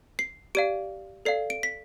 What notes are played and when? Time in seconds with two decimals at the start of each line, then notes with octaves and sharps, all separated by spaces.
0.19 C7
0.55 G4 D5 F5 D7
1.25 A4 D5 F5 C7
1.50 D7
1.63 B6